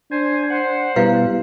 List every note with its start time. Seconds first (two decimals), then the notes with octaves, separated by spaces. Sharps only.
0.12 D4 C5 G#5
0.50 C5 F#5
0.96 B2 G3 B3 E4 B4 F5